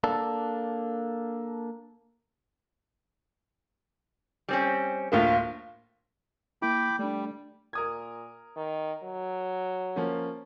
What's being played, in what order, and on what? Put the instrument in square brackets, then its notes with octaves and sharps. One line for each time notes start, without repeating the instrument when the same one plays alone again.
[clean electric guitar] A#3 D4 A4
[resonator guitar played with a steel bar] G3 C4 C#4
[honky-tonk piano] D2 A2 A#3 [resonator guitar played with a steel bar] F3 A3 F4
[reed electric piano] A#3 E4 [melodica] G5 B5 D6
[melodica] G3 [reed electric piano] A3 D4
[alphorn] A#2 [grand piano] A#4 D#6 G#6
[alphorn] D#3
F#3
[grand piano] F3 A#3 C#4